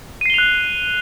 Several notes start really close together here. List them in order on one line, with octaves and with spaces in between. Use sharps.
D#7 C7 G7 F7 F#6